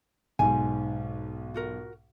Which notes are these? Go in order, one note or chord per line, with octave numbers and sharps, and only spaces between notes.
B1 G#2 G#5
F4 F#4 A#4